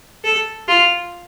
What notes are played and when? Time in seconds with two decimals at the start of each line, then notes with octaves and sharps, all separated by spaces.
0.24 A4
0.68 F4